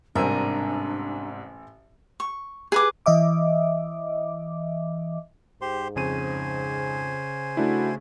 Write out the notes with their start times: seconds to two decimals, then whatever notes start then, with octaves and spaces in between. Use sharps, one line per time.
0.15 A1 G#2 C3 G3 D4 A#4 G#5 E6
2.20 C#6
2.72 G#4 B4 D6
3.06 E3 D#5 E5 D6
5.61 G#2 G4 C5 C6
5.96 F2 C#3 C5 G#5 D#7
7.57 A3 D4 E4 F#4